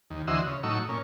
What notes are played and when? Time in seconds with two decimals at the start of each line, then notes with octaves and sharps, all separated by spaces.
0.10 D#2
0.27 D2 E3 F#4 C5 D#5 E6
0.47 C#3
0.63 A2 F#3 D#4 C#6 E6
0.89 A#2 C#4